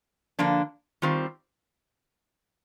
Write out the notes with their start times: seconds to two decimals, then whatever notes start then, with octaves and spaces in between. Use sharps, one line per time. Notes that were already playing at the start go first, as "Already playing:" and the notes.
0.39 D3 F3 A#3 D4
1.02 D#3 G3 C4 F4